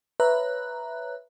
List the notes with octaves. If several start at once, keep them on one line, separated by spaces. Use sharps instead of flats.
B4 C#5 E5 A#5 F#6